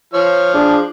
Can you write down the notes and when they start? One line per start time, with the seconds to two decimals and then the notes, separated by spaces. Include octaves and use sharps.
0.14 F3 C#5 F6
0.54 D4 G#4